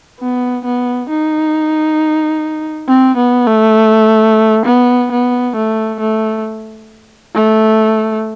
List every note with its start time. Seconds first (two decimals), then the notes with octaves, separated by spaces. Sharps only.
0.20 B3
0.65 B3
1.09 D#4
2.88 C4
3.17 B3
3.47 A3
4.66 B3
5.11 B3
5.55 A3
6.00 A3
7.35 A3